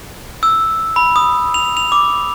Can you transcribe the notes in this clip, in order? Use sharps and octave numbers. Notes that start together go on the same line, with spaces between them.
E6
B5
D#6
F7
F7
D6